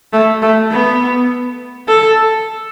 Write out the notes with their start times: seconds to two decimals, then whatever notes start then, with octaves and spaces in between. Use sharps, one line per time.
0.13 A3
0.43 A3
0.72 B3
1.89 A4